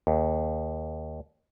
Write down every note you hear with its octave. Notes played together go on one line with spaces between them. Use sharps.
D#2